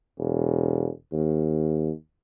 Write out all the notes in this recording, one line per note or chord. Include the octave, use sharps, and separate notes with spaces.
E1
D#2